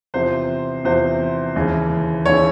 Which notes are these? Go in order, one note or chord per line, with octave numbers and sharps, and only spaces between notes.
E2 C3 F3 C5
E2 C3 F3 C5
D#2 C#3 E3
D#2 C#3 E3 C#5